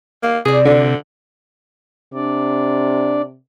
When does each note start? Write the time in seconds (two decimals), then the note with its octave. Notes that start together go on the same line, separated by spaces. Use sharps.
0.23 A#3 F5
0.45 C3 G#4 C5 D5
0.65 D3
2.14 C3 D4 D5